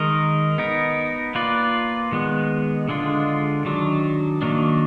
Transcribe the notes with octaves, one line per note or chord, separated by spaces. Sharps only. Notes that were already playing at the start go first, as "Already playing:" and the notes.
Already playing: D#3 G#3 D#4 A#4 D#5
B3 D#4 A#4
A#3 F4 B4 D5
D#3 G#3 B3
D3 G#3 D4 F4
D#3 F#3 D4
D#3 F#3 A#3 D4